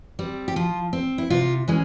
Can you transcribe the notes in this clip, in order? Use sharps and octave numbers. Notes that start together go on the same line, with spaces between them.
G3 C4
G4
F3 F4
C4
E4
C3 F4
E3 G#3 C#4